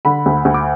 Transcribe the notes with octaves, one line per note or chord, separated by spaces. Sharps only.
D3 B5
D2
D2
D6